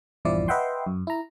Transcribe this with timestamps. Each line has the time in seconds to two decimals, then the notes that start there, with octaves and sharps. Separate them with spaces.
0.25 A#1 E2 G2 F3 E4 D5
0.48 B4 D#5 E5 F#5 G5 C6
0.86 F#2
1.07 E4 A#5